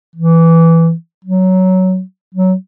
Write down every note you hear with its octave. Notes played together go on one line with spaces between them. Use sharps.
E3
F#3
F#3